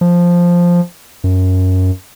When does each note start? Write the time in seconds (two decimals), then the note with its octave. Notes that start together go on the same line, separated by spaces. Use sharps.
0.01 F3
1.24 F#2